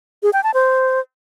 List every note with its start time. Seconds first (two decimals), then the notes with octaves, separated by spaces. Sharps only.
0.23 G#4
0.33 G5
0.44 A5
0.54 C5